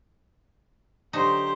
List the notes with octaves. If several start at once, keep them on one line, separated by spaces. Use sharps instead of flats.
D3 F#3 D#4 G4 C5